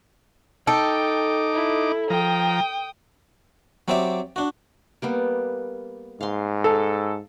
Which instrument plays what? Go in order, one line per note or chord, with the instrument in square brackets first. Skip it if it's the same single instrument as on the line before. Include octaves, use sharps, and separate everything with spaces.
[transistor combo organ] D#4 D6 [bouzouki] A4 [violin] G5
[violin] E4
[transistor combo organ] F3 A#5 [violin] G5 D#6
[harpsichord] F#3 C4 G4 D5 E5
D4 F#4
[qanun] G3 A#3 B3
[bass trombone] G#2 [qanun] F5 C6
[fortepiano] A4 [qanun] F5